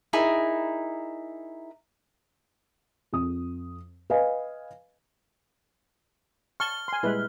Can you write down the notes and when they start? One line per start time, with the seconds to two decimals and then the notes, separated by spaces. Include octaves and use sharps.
0.13 D#4 E4 G#4 A#4
3.13 F2 D#6
4.10 B4 D#5 F5 G#5
6.60 A5 C#6 F6 G7
6.88 G#5 C6
7.03 A#2 G3 G#3 E4 B4